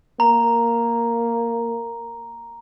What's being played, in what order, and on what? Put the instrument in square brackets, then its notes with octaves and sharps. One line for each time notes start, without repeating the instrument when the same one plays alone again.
[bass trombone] A#3 [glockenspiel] A#5